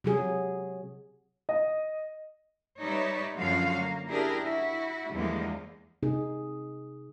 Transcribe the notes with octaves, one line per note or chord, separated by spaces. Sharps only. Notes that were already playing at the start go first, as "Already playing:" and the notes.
C3 F#3 G#4
D#5
G3 D#4 B4 C#5 D5 E5
F#2 D3 F3 F4 F#4 F5
A#3
D4 E4 G4 G#4 A#4
E4 F#4
E2 D3 F3 G3 G#3 A#3
C3 D#4 G#4